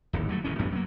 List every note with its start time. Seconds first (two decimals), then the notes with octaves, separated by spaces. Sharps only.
0.13 D1 G#1 D#2
0.29 F#3 G3 A3
0.44 D#1 D#2 E3 C#4
0.58 A1 F#2 E3 B3
0.72 F#3 A#3